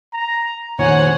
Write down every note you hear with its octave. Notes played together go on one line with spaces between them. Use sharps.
A#5
F1 A#2 D#3 C5 C#5 F#5 G#5